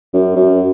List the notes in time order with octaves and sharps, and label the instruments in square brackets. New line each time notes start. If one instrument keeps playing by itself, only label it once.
[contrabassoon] F#2
F#2